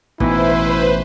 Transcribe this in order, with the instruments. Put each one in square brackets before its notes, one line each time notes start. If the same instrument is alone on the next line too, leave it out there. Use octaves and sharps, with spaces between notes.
[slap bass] A1 [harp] B2 E3 D#4 [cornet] E4 [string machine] B4 C5